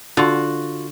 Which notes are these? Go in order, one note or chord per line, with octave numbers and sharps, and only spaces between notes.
D3 F4 F#4